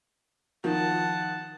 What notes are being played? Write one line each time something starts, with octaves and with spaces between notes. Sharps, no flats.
D#3 F3 F#5 A5